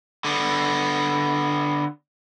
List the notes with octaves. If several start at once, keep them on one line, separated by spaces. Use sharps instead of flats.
D3 B3